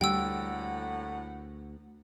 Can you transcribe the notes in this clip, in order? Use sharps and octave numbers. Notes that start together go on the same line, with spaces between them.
D2 A2 G3 A#3 F#5 G5 E6